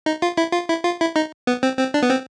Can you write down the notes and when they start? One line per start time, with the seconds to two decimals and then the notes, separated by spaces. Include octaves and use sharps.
0.06 D#4
0.22 F4
0.37 E4
0.53 F4
0.69 E4
0.85 F4
1.00 E4
1.16 D#4
1.47 B3
1.63 C4
1.79 C4
1.94 D4
2.03 B3
2.10 C4